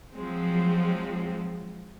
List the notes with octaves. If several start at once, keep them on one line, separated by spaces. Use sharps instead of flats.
F3 F#3 G#3 C4